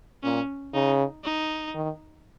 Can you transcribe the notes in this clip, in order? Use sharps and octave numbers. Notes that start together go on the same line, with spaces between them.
A#2 C#4
C#3 D#4
D#4
D#3